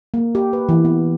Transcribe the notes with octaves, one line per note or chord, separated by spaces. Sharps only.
A#3
G4
B4
E3
B3